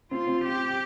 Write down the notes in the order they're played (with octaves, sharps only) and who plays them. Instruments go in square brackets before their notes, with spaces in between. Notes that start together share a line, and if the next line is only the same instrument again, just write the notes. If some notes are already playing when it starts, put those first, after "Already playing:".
[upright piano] C4 [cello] F4
[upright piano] C4
[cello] G4